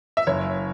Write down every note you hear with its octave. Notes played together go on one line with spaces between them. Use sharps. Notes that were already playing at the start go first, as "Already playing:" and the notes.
E5
F#1 C#5